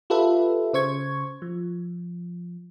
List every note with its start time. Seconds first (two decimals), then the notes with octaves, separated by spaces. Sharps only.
0.10 F4 G4 A4 B4 E5
0.73 C#3 C5 C#6 G#6
1.42 F3